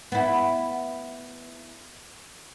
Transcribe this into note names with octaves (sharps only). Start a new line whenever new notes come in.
B3 E4